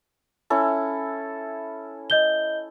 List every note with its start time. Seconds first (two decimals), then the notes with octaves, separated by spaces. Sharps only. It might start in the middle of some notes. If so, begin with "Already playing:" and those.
0.50 C#4 E4 A4
2.10 D#5 G6 G7